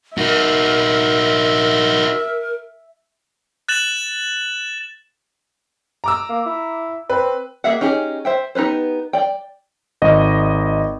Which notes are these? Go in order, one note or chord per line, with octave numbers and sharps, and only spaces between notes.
D#4 F#4 A#4 E5
F#6 A6 E7 F#7
A#5 D6 E6
A#3
E4
C4 B4
A#3 G#4 E5 F#5
C#4 D#4 G4 G#4
C5 E5 G5
B3 D#4 G4 B4 C5
D5 G5
G#1 D#5